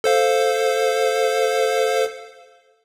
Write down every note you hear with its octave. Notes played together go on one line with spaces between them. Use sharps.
A4 C5 F5